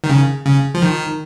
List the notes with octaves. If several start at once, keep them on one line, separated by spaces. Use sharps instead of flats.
D#3
C#3
C#3
F3
D#3